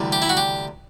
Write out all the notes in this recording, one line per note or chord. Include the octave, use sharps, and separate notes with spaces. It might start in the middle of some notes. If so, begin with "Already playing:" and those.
Already playing: D2 C3 E3 G3
G4
E4
F#4
G4